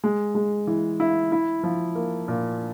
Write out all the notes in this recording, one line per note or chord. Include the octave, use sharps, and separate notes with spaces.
G#3
G#3
E3
E4
E4
F3
A#3
A#2